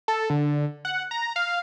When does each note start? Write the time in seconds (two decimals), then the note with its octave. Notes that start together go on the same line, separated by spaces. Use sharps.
0.08 A4
0.30 D3
0.85 F#5
1.11 A#5
1.36 F5